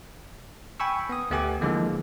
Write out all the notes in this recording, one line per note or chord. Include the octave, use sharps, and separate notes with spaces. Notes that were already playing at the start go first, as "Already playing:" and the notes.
G5 G#5 B5 C#6 E6
B3 D#6
D2 A3 B3 G4 G#5 D6
D3 E3 F3 G#3 A#3